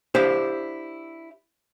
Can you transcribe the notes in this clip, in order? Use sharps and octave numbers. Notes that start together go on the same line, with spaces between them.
D4 E4 G4 C5 F5